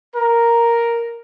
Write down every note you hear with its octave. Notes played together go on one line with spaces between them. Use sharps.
A#4